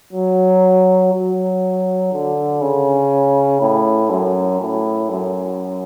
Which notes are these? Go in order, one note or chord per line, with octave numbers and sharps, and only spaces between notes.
F#3
F#3
D3
C#3
A2
F#2
A2
F#2